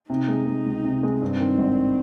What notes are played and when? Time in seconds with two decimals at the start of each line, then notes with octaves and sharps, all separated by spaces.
0.09 C3 D#4
0.28 G#3
0.46 G#3
0.66 C#2
0.84 C3
1.03 G#3
1.22 G2 C4
1.40 D#3
1.59 G#1